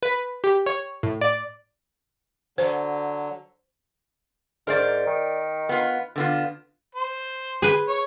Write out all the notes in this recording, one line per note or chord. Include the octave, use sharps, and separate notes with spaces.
B4
G4
C#5
A2
D5
D3 F#3 C5
G#2 A#4 C5 D5
D#3
B3 F4
D3 B3 F4
C5
G#4 B4
C#5